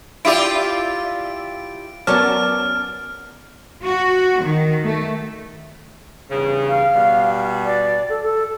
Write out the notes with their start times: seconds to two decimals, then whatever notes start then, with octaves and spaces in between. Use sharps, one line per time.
0.25 E4 F4 G4 D5 E5 D7
2.07 F#3 B3 C#4 A#4 D5 A5 F6
3.85 F#4
4.45 D#3
4.86 A3
6.31 E2 G2 C#3
6.67 F5
6.94 B2 G3
7.65 D5
8.09 A4
8.23 A4